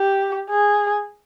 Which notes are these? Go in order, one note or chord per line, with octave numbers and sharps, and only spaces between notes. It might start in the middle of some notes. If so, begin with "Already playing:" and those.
Already playing: G4
G#4